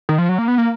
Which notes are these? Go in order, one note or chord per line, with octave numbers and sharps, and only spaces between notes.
D#3
F3
F#3
A#3
B3
A#3